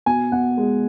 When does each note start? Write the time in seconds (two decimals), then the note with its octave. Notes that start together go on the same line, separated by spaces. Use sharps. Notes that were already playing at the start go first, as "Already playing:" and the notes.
0.06 B2 G#5
0.32 B2 F#5
0.57 G#3